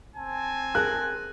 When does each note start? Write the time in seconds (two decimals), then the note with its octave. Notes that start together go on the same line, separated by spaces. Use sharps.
0.16 C4 G#5 A5
0.75 G#4 A#4 F#6